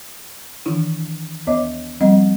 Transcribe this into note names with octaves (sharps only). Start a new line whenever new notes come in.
D#3 E3 D4 E4
D#2 B3 C#5 D#5 E5 D6
F3 G3 C4 D#5